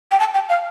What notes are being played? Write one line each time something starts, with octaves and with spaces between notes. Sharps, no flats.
G5
A5
G5
F5